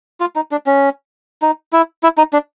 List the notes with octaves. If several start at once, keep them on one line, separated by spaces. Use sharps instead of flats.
F4
D#4
D4
C#4
D#4
E4
E4
D#4
D4